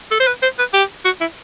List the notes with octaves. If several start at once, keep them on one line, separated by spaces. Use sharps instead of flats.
A4
C5
B4
C5
B4
G4
F#4
E4